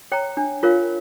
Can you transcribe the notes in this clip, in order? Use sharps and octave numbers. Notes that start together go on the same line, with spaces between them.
C#5 G5 A#5
D4
F4 A#4 C#5 F5